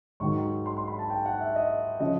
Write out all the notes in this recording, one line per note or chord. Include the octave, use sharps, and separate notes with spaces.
G#2 D#3 F#3 C#6
C6
C6
B5
A5
G5
F#5
E5
D#5
C#3 F3 D#5